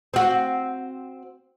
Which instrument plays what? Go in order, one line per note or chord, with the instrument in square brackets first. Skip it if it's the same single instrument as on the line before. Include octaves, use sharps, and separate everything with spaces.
[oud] C4 F#4